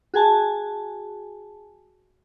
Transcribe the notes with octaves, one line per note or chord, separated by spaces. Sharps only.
F#4 G#4 G#5 A5